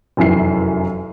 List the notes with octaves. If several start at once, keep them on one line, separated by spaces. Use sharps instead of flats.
F1 F#2 E3 C7